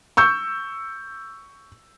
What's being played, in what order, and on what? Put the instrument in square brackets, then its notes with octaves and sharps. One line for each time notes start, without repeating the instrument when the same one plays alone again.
[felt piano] C#6 E6 G6